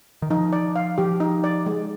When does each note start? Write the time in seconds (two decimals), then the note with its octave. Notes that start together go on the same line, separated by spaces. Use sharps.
0.22 D#3
0.31 F3 D#4
0.53 D5
0.76 F5
0.98 F3 G4
1.20 D#4
1.44 D5
1.66 G#3